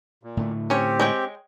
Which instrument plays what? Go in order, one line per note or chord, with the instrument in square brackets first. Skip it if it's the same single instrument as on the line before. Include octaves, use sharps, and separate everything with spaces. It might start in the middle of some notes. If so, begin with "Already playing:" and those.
[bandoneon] A#2
[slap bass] A2 D3 A3
[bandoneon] C4 G4 [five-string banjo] C#4 C#5
[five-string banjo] G#3 C#5 G5